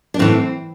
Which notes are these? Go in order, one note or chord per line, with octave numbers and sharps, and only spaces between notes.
D4
A2 E3 C4